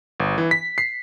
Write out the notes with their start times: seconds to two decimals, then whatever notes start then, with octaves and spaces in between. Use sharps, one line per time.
0.20 G1
0.38 E3
0.51 B6
0.78 C7